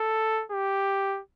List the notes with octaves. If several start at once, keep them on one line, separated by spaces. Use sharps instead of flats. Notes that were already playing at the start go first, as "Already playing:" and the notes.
Already playing: A4
G4